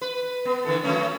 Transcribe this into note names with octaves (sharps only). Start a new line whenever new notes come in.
B4
B3
D3 E3 A4
F3 A3 C#4